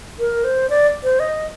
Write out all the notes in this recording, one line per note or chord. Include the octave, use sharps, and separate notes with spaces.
A#4
C5
D5
C5
D#5